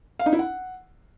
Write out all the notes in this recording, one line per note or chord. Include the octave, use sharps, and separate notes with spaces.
F5
D#4
E4
F#5